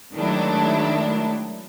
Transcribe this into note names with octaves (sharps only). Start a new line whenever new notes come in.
D#3 F#3 G#3 A3 D4 E4